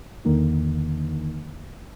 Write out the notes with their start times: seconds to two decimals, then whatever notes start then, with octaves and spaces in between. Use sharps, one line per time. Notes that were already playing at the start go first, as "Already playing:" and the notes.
0.25 E2 D3 D#3 A#3 D#4